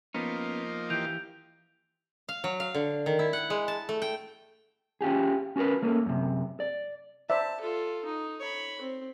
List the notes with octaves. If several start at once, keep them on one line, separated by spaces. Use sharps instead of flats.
F3 A#3 B3 C#4 D#4
E3 G4 G6 D7 F7
F5
F#3
F5
D3
D#3
E4
F#5
G#3
A5
A3
G5
C#4 F4 G4 G#4
C#4 F#4 G#4 A#4 B4
A3 A#3 C#4
F#2 C3
D5
C5 D5 E5 A5
F4 A4
D#4
C#5 B5
C4